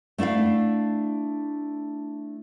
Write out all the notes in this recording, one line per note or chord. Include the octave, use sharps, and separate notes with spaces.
A3 D4 E4 D5 F5